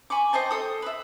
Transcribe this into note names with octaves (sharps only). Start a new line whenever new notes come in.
G#5 B5 C#6 D6
C5 D#5 G5 A5
A4 D#6
B4 E5